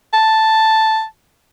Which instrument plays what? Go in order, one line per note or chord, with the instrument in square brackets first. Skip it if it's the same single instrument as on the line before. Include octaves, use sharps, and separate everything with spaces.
[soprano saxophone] A5